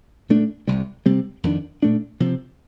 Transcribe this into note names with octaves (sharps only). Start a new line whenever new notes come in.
A#2 A3 D4
C2 C3 G3
C3 G3 C4
F2 D#3 A#3 D4
A#2 A3 D4
C3 F3 C4